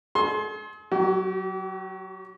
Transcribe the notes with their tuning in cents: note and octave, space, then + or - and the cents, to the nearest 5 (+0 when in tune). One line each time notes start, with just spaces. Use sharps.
G#4 +45 C6 +15
F#3 +10 G4 -40